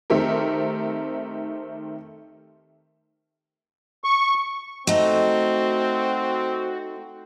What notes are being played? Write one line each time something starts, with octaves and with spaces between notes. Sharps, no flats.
D#3 A3 C4 G4 A#4
C#6
A3 C4 D#4 F#4